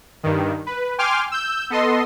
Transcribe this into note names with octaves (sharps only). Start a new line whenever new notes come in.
G2 D#3
B4
G5 G#5 C6 D6 F6
E6 G6
B3 A4 D#5 C6